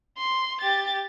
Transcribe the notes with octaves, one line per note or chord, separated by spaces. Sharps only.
C6
G4 A6